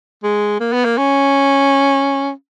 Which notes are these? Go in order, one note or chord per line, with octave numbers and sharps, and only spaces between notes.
G#3
A#3
B3
A#3
C#4